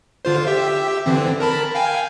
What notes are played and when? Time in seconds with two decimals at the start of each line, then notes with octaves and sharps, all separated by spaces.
0.25 D3 F4 C5
0.47 G4 E5
1.06 D3 E3 C4
1.40 A#4 A5 B5
1.75 F5 G5 G#5